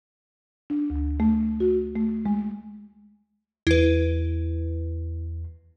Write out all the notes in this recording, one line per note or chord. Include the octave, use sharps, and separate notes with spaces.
D4
D2
A3
F#4
A3
G#3
E2 E4 B4